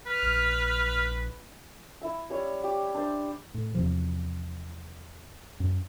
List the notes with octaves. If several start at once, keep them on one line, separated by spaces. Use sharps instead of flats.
B4 F6
A#1
E4 E5 E6
G3 C#4 E4 C#5
G4
D4 C5
A2
E2 C3 F3
F#2